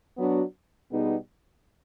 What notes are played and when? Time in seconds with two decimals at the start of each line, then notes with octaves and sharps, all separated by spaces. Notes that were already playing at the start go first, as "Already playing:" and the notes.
0.17 F#3 B3 D4 F#4
0.89 B2 G3 B3 D#4 G#4